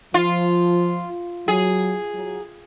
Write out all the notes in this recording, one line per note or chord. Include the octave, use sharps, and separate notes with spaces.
F3 F4
F#3 G#4
F#3